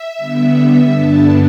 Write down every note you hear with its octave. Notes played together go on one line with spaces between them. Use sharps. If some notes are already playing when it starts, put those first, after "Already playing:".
Already playing: E5
D3 G3 B3
G2 D3 G3 B3 D4 A5